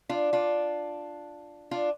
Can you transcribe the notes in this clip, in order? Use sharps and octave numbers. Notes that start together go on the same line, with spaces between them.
D4 F4
D4 F4
D4 F4